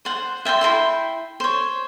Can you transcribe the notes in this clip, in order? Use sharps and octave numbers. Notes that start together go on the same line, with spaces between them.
C5 F#5
E5 G5 A5 C6
E4 A#4 G5 C6
C5 C#5